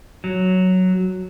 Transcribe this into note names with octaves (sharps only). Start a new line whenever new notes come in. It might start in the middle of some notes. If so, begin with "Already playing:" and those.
F#3